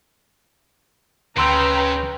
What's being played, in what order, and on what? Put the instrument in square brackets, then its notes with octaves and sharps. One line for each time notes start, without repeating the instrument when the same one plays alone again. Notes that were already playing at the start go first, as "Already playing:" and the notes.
[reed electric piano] D2 C6 E6 [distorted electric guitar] C#3 [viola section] B4 G5 A#5